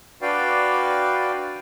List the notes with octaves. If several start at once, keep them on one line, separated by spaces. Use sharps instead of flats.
D4 F#4 B4 D5 F5 G5